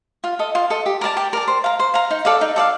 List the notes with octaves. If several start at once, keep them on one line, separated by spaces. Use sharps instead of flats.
F4
A4 D#5
F4
A4 D#5
G4
A#4 D5 A5
G4
A#4 D5 A5
C5
F5 A#5
C5
F5 A#5
D#4
A4 D5 F5
D#4
A4 D5 F5